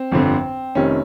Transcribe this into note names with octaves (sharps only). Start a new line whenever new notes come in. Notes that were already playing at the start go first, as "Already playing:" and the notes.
Already playing: C4
G1 F2 D3
F1 F2 C3 D#3 C#4